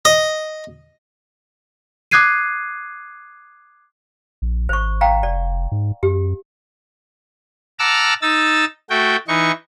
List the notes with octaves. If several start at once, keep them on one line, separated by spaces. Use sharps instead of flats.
D#5
D6 D#6 F#6 G#6 C7 D#7
A#1
G#1 C5 C#6
F5 G5 A#5
F1 D5
G#2
F#2 G4
F#5 A5 A#5 D6 E6 F6
D#4 E6 A6
A3 F#4 G5
E3 D#4 C#6